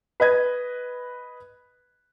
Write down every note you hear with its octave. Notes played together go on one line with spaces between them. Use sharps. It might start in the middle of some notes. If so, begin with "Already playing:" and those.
B4 D#5 G#6